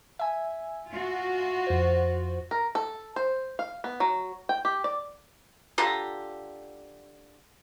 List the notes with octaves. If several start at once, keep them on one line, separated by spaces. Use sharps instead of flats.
E5 G#5
F4 F#4
F2 C5
A#4
A4
C5
F5
B3
F#3
G5
G4
D5
D3 F4 G4 A#5